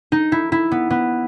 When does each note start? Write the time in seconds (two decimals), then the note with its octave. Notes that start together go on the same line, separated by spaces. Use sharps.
0.12 D#4
0.32 E4
0.52 E4
0.71 B3
0.90 B3